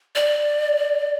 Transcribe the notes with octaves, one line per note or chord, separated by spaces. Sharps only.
D5